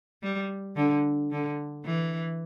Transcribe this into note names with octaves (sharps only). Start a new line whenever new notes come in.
G3
D3
D3
E3